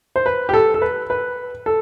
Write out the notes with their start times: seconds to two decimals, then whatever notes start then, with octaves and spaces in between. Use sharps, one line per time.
0.16 C5
0.26 B4
0.49 G4
0.54 A4
0.74 A4
0.82 B4
1.10 B4
1.66 A4